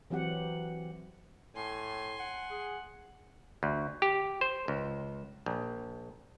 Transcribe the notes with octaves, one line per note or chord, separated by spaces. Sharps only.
E3 F#3 C4 G4 F#5
A2 G#5 C6
F#5
G#4
D2
G4
C5
C#2
A#1